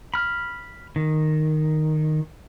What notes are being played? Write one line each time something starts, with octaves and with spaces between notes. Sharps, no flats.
B5 F6
D#3